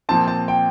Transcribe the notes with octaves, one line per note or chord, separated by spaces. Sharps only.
A#2 F3 C4 A5
A5
G5